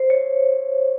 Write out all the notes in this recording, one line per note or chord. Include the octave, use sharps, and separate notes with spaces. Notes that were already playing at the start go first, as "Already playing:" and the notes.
Already playing: C5
C#5